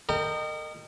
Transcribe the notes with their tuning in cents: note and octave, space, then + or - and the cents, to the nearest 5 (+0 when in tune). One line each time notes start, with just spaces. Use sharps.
A#4 -35 D#5 -20 G5 +0